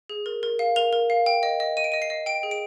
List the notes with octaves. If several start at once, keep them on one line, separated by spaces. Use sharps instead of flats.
G#4
A#4
A#4
F5
A#4 F7
A#4
F5
G5
D#5
D#5
D#5 D#7
D7
D#5 D#7
C7
D#5
G5 D7
G#4
D7